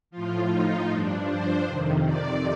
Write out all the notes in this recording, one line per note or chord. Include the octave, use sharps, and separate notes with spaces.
A2 F3 F4
D#4
G2 F3 D4
C5
F2 C3 D#3
D5